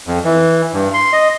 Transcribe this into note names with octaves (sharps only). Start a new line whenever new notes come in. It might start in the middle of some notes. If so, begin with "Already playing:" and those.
F2
E3
G2
C6
D#5